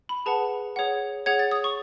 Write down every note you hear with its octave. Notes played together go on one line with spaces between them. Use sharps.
B5
G#4 B4 F#5 A5
G#4 C#5 F#5
G#4 C#5 F#5 G#6
A6
D#6
C#6